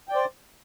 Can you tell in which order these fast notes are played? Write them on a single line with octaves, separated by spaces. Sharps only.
G5 D5 C5